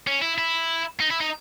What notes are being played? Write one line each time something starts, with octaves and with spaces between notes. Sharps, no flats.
C#4
E4
E4
D#4
E4
D#4